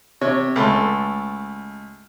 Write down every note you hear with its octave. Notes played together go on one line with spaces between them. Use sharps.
C3 C#5
C#2 A3 C6